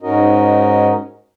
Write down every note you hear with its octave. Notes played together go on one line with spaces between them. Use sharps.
G#2 C#4 D#4 F#4 A#4 D#5